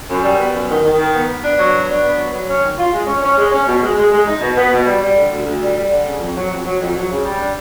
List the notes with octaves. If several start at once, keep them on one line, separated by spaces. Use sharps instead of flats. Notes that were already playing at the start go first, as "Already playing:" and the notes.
F#2
G3
B3
F#2
D#3
D#3
D#3
B3
B3
D4
F#3
B3
D4
B3
F#3
F#3
C#4
D#3
F4
G#3
C#4
C#4
G#3
C#4
B2
G#3
G#3
G#3
D#4
B2
B3
B2
G3
G3
D3
D2
D2
G3
G3
D3
C#3
F2
F#3
F2
F#3
F2
F#3
C#3
G3
D4